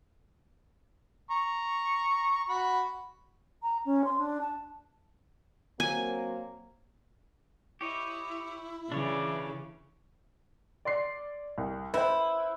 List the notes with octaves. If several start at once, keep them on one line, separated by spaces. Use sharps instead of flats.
A#5 C#6
F#4 B5
A#5
C#4
C6
D4
A5
F#3 A#3 C4 G#5
E4 G4 C#5 D#5
C#3 E3 D4 C#5 D5
D5 C6 C7
C2
E4 B4 C5